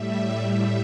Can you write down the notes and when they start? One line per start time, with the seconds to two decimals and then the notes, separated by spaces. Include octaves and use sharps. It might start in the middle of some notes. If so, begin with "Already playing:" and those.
Already playing: A2 G3 E5